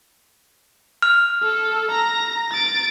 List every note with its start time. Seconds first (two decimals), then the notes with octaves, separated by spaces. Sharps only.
1.02 F6
1.43 A4
1.91 A#5 A#6
2.52 A6 D7